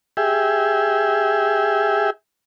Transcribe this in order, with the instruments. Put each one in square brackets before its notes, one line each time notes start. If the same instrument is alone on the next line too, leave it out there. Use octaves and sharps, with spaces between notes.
[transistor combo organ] G4 G#4 E5